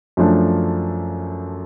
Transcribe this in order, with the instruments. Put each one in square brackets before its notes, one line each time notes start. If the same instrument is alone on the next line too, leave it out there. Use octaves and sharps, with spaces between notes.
[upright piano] F#2 F3 A3 D4